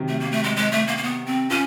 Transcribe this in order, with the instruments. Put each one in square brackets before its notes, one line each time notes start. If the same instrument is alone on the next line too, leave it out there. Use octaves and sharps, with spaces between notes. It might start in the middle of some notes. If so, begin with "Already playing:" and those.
Already playing: [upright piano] C3 D#3 F#3
[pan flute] A3
A#3
A3
G#3
G#3
A3
A#3
A#3
B3
C4
[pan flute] C#4 [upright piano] F4